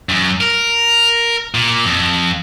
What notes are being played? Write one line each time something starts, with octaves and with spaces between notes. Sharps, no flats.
F#2
A#4
A#2
F2